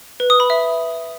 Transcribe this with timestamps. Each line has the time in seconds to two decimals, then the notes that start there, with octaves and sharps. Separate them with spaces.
0.20 B4
0.30 D#6
0.40 B5
0.50 E5